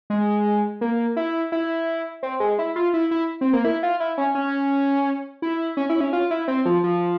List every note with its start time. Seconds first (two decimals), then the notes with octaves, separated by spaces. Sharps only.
0.10 G#3
0.81 A#3
1.17 E4
1.52 E4
2.23 C4
2.40 G#3
2.59 E4
2.76 F4
2.94 E4
3.11 E4
3.41 C4
3.53 A#3
3.64 E4
3.83 F4
4.00 E4
4.18 C#4
4.35 C#4
5.42 E4
5.77 C#4
5.90 E4
6.01 C#4
6.13 F4
6.31 E4
6.48 C4
6.65 F3
6.84 F3